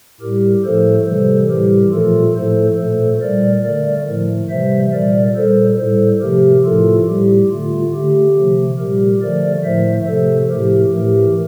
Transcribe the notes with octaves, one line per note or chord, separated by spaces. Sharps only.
A2 G3 G4 A#4
A2 F3 A3 A4 C5
C3 E3 G3 A4 C5
A2 E3 G3 G4 A#4
A#2 F3 A3 F4 A4
A2 F3 A3 A4 C5
A#2 A3 A4 C5
A#2 G3 A#4 D5
D3 A3 A#4 D5
A2 F3 A3
C3 E3 G3 C5 E5
A#2 G3 A#4 D5
A#2 G3 A4 C5
A2 G3 A4 C5
C3 F3 A3 G4 A#4
A2 F3 A3 F4 A4
A2 G3 G4
D3 A3 F4
D3 A3 G4
C3 F3 A3
A#2 G3 G4 A#4
D3 F3 A3 A#4 D5
A2 F3 A3 C5 E5
C3 F3 A3 A4 C5
A2 F3 A3 G4 A#4
A2 E3 A3 G4 A#4